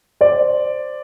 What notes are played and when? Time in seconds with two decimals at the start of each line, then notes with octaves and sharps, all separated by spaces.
0.21 C5 D5